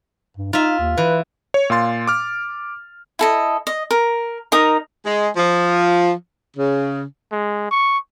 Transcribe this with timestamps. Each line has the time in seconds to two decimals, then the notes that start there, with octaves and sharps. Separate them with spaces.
0.37 G2
0.53 D#4 F4 E5
0.80 D#2
0.98 E3 B4
1.54 C#5
1.70 A#2 F5 C6 A6
2.07 D6 F6
3.19 E4 A4 D#5
3.67 D#5
3.91 A#4
4.52 D#4 A#4 A#5 D#6
5.05 G#3
5.36 F3
6.56 C#3
7.32 G#3
7.71 C#6